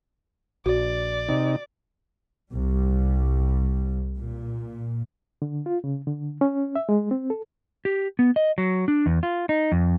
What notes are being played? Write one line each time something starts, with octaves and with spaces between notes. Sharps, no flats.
A#1 F#4 D5
C3 D#4
C2 G3
A#2
D3
F4
C#3
D3
C#4
E5
G#3
C4
A4
G4
B3
D#5
F#3
D4
E2
F4
D#4
F2